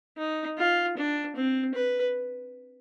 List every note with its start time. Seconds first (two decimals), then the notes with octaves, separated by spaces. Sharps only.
0.18 D#4
0.58 F4
0.97 D4
1.36 C4
1.75 B4